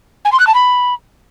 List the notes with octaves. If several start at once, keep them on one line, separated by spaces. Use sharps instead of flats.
G#5
C6
F#6
A5
B5